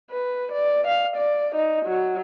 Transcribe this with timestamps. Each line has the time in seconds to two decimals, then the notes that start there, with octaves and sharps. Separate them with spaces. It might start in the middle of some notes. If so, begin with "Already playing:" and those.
0.10 B4
0.52 D5
0.87 F5
1.17 D5
1.55 D#4
1.86 F#3